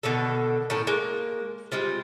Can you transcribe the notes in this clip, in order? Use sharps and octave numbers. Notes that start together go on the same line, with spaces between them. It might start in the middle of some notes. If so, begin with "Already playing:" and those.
B2 D3 D#3 A4
A2 D#3 C#4 A4
G#3 A#3
G3 G#3 C4 F4